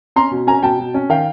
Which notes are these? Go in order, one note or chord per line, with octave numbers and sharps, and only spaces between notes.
C#4 A#5 C6
B2
C#4 G#5 A#5
B2 G5 A5
B2
C#4
D#3 F5 G5